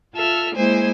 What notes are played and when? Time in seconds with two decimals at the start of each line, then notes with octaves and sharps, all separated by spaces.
0.14 F4 A4 E5 F6
0.54 G#3 A#3 E4 C5 G#5